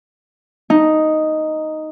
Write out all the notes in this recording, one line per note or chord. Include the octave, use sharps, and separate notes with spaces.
D#4